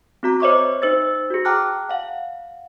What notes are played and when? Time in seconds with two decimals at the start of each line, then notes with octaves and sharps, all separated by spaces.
0.23 C4 F#4 A#5
0.40 C5 C#5 D#5 E5 C#6 D6
0.82 D#4 C5 E6 A6
1.30 F#4 G#4
1.45 G5 A5 A#5 D6 F6 F#6
1.89 F5 F#5